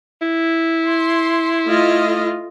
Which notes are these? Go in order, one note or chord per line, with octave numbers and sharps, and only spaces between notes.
E4
C6
A3 F4 D#5